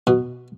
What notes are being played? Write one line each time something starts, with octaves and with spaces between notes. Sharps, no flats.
B2